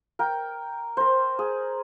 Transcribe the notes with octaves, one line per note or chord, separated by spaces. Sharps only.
A#4 G5
A#4 C5
G#4